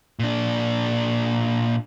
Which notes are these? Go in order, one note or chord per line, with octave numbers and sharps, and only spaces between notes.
A#2 D4